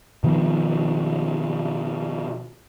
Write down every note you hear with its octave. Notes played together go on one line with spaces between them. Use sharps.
B2 D#3 F3 B3